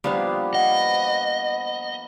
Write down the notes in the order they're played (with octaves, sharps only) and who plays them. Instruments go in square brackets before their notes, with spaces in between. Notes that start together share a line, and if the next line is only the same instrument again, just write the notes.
[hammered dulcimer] F3 A#3 B3 [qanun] G3 D4 F5
[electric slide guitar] D#5 [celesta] F#5